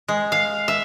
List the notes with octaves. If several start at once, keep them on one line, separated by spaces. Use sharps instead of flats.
G#3
F5
E5